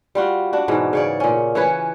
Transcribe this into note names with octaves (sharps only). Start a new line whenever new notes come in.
G3 F4 F#4
D4 F#4
G#2 B2 E3
C#3 C#5 D5
A#2 C#4
E3 C#4 B4 C#5